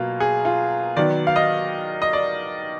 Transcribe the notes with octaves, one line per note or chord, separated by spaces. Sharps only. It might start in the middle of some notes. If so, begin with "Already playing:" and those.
Already playing: B2 F#3 A#3 F4
G#4
F4
D#3 F#3 B3 D5
F5
D#5
D#5
D5